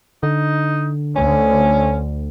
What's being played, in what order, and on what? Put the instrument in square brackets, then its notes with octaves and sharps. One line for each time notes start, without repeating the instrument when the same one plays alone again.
[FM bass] D3 [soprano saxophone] D#4
[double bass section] D2 [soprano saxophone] C#4